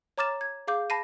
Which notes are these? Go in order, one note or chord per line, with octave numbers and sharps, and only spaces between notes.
C#5 A#5 D6 F6 A6 E7
G#6
G#4 F5 D6 G6
A5 B5 A#6 C7 D#7